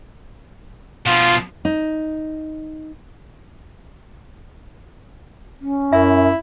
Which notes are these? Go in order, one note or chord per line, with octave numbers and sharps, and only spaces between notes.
B2 F3 F4
D#4
C#4
F#2 E4 E5